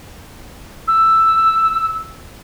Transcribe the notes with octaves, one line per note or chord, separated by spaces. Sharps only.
E6